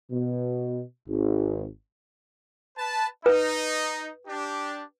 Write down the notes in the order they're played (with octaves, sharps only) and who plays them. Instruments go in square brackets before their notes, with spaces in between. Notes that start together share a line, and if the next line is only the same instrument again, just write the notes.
[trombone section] B2
G#1
[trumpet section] B4 A5
[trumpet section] D#4 [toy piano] B4
[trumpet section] D4 G4